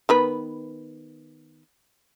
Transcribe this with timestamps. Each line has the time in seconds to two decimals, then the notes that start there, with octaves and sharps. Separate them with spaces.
0.09 D#3 B3 B4